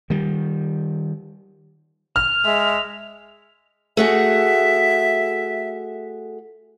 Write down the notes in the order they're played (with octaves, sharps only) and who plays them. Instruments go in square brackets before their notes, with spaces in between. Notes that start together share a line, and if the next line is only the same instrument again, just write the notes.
[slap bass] D#3 G3
[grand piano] F6 [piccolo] F7
[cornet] G#3 [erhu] E5
[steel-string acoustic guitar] A3 F#4 G#4 [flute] E5